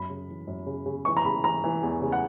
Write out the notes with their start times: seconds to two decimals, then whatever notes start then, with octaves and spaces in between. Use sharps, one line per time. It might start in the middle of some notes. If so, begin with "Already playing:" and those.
Already playing: F#2 B5
0.09 C#3
0.28 E3
0.47 F#2
0.66 C#3
0.86 C#3
1.05 E3 C#6
1.17 A#5
1.25 C#3 B5
1.44 E3 A#5
1.64 E3
1.83 E2
2.02 C#3
2.12 F#5